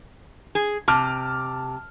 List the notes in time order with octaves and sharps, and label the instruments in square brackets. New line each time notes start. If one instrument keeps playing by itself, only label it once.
[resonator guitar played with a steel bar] G#4
[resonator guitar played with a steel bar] C3 [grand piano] A5 D6 F6